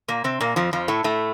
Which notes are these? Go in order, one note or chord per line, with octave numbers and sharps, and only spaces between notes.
A#2 A#3
C3 C4
A#2 A#3
F2 F3
F2 F3
A2 A3
A2 A3